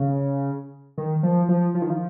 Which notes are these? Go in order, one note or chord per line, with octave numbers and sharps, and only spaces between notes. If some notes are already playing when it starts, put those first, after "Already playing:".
Already playing: C#3
D#3
F3
F3
F3
D#3
F3